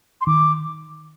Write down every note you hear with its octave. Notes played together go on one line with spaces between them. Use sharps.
C6
D#3 D6